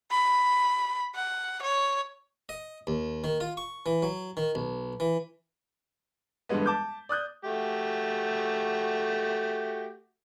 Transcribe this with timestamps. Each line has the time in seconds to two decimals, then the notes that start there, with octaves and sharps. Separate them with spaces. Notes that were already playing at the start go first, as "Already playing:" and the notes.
0.11 B5
1.15 F#5
1.63 C#5
2.49 D#5
2.87 D#2
3.24 D#3
3.40 F4
3.57 C#6
3.86 E3
4.02 F#3
4.37 D#3
4.55 B1
5.00 E3
6.49 G2 D3 E3 G3 G#3 B3
6.66 A5 D6 G6
7.09 D5 D#6 F#6 G6
7.44 A3 F#4 G4